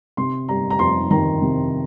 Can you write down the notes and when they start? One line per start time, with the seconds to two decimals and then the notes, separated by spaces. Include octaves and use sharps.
0.17 C3 C6
0.48 G3 A#5
0.70 A#5
0.79 F2 C6
1.11 D#3 A#5
1.42 C3